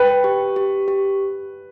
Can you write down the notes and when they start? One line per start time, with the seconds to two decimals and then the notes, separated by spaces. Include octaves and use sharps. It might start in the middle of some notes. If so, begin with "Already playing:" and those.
Already playing: B4 G5
0.24 G4
0.56 G4
0.88 G4